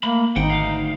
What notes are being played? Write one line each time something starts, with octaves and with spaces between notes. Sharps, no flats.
A3 A#3 B5
G#1 D#4 F#5 G5
D2 F5